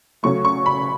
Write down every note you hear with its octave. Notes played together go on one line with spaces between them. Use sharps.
C#3 F#3 A3 C#6
C#6
B5